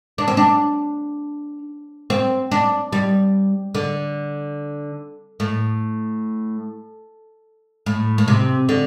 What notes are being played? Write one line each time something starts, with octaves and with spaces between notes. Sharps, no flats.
D4
C4
D4
C4
D4
G3
D3
A2
A2
A2
C3
D3